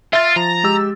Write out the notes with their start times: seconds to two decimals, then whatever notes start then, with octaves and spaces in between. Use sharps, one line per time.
0.13 F4 E5 A6
0.36 F3 A#5
0.64 G#3 G4 E6